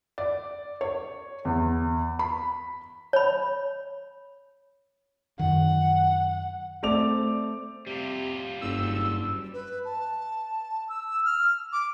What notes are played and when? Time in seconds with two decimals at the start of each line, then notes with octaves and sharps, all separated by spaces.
0.18 D5
0.81 C#5
1.45 E2
2.19 B5
3.13 C#5 B5
5.39 F#2 D#3 F#5
6.83 A3 C4 D5 D6 F7
7.87 C3 G3 F4
8.62 F#1 G2 E6
9.53 B4
9.85 A5
10.89 E6
11.25 F6
11.72 D6